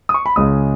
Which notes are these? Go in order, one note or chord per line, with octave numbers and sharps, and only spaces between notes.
D#6
C#6
B5
C#2 C#3 G#3 D#6